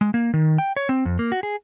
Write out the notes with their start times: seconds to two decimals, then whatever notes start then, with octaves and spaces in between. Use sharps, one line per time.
0.01 G#3
0.14 A#3
0.34 D#3
0.58 G5
0.77 C#5
0.89 C4
1.05 F2
1.19 A#3
1.32 F#4
1.43 G#4